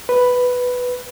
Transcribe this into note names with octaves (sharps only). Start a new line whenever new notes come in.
B4